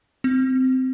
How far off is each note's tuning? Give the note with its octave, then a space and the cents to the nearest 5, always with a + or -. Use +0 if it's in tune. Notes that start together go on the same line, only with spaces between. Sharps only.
C4 -15